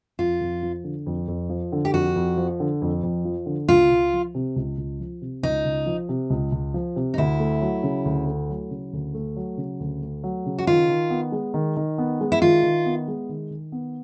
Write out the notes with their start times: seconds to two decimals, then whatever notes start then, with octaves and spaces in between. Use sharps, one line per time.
0.19 F2 F4
0.41 F2
0.63 F3
0.84 D3
1.06 F2
1.28 F2
1.50 F3
1.72 D3
1.85 G4
1.93 F2 F#4
2.16 F2
2.37 F3
2.60 D3
2.82 F2
3.03 F2
3.25 F3
3.46 D3
3.69 C#2 F4
3.91 C#2
4.13 F3
4.35 C3
4.56 C#2
4.78 C#2
5.00 F3
5.22 C3
5.43 C#2 D#4
5.65 C#2
5.86 F3
6.09 C3
6.30 C#2
6.52 C#2
6.74 F3
6.96 C3
7.14 D#4
7.18 D2 E4
7.40 A3
7.62 F#3
7.83 C#3
8.05 D2
8.27 A3
8.49 F#3
8.70 C#3
8.93 D2
9.14 A3
9.36 F#3
9.57 C#3
9.80 D2
10.02 A3
10.24 F#3
10.46 C#3
10.59 F#4
10.67 D#3 F4
10.90 D#3
11.10 B3
11.32 G#3
11.54 D#3
11.77 D#3
11.98 B3
12.21 G#3
12.32 E4
12.41 D#3 F4
12.63 D#3
12.86 B3
13.08 G#3
13.29 D#3
13.51 D#3
13.72 B3